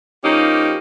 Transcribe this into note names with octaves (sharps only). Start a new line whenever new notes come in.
F3 A#3 C#4 D#4 G4